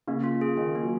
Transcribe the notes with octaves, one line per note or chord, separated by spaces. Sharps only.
C#3 A#3
F4
G#4
D#3 C#4
A#3
F#3